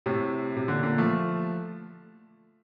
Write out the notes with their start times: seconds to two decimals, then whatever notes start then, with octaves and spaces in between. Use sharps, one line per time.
0.06 A2 C3
0.57 C3
0.68 A#2 D3
0.83 A#2 D3
0.98 F3 A3